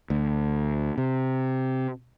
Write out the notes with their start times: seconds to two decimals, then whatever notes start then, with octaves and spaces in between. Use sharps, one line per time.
0.10 D2
0.98 C3